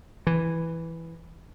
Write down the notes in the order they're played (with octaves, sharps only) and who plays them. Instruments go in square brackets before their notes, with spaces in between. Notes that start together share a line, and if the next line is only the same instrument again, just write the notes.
[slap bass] E3